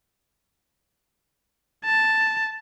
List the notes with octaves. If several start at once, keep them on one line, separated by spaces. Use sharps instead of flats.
A5